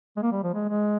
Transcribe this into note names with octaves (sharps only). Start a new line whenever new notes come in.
G#3
A#3
G3
F3
G#3
G#3